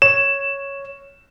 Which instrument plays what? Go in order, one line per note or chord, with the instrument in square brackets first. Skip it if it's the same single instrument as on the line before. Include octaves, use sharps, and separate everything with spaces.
[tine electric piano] C#5 [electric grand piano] E7